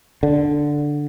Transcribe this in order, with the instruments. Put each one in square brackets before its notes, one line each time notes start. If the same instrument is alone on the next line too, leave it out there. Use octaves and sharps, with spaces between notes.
[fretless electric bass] D3